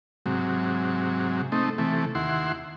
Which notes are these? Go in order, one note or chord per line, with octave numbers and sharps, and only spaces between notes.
G#2 C3 F#3
A3 C4 D#4
C3 E3 A3
D#2 E4 F#5 C6